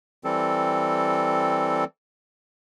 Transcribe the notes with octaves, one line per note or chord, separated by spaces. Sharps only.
E3 G3 C4 A4